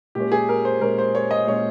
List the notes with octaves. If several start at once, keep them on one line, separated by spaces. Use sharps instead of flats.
A#2 G#3 C#4 G4
G#4
A#4
C5
A#2 G#3 C#4 A#4
C5
C#5
D#5
A#2 G#3 C#4 C#5